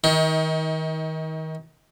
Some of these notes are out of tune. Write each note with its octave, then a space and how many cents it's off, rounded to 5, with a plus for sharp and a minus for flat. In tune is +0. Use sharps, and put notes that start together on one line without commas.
D#3 +30 D#4 +45